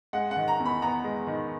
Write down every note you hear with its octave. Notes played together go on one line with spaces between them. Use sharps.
G#3 F#5
F#5
D#3
A#5
E2
B5
B3 A#5
G#3
D#3